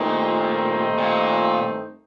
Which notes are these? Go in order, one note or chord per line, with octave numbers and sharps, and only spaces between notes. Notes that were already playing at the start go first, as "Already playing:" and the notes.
Already playing: G2 A#2 D#3 A3 C4 D#4
A#2